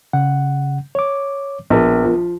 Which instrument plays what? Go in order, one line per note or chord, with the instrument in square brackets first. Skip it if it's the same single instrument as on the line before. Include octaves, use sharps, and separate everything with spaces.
[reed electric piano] C#3 F#5
C#5 D6
[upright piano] A#1 [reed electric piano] B3 A#4
[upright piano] F3